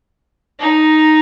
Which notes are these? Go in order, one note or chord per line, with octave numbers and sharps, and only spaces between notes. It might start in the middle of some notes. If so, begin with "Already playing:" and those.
D#4